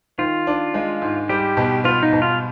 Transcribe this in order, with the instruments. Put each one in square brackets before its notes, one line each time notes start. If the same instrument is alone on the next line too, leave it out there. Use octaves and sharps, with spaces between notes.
[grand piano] D#3 [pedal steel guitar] F4
[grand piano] D4
G#3
G#2
[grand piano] G3 [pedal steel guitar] G4
[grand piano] B2
[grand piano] B3 [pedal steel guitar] F4
[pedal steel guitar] D#4
[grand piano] B2
[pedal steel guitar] F4